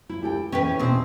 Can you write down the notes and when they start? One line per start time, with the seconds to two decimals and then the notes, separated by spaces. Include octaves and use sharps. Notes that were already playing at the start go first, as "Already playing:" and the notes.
0.09 E4
0.22 G4 A4 G5
0.52 E2 E3 C#4 G4 B4
0.79 B2 C4